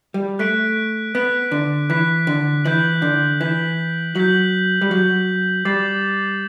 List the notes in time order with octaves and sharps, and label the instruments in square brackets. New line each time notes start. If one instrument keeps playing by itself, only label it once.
[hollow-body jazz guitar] G3
[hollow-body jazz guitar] A3 [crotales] F#6 B6 D7
[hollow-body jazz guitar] B3 [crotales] F#6 B6 D7
[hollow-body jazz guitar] D3
[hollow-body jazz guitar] E3 [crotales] F#6 B6 D7
[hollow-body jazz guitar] D3
[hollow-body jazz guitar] E3 [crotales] G6 B6 F#7
[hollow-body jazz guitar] D3
[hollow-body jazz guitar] E3 [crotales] G6 B6 F#7
[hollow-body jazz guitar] F#3 [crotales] G6 B6 F#7
[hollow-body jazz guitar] G3
[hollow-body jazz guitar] F#3 [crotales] G6 B6 F#7
[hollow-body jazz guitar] G3 [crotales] D6 A6 C7 F#7